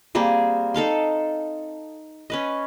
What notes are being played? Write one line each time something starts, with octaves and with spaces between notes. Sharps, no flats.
G3 A#3 C4 G#4
D#4 A4 F5 C6
C#4 B4 D#5